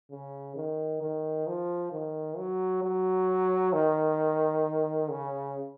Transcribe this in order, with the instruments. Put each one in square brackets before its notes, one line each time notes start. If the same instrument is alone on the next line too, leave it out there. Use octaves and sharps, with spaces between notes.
[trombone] C#3
D#3
D#3
F3
D#3
F#3
F#3
D#3
C#3